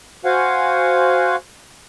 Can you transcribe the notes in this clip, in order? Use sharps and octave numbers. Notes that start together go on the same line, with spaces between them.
F#4 C5 F5 F#5 G#5